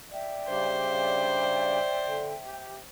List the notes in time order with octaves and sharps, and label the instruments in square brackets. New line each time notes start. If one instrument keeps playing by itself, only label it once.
[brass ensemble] D5 [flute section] E5 G5
[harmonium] C#3 G3 D4 [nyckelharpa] C5
[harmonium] D3
G4